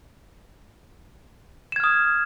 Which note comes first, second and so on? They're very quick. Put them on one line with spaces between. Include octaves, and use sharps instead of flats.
E7 G#6 F6 D#6